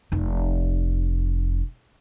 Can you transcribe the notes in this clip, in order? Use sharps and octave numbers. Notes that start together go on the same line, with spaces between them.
F1 D#4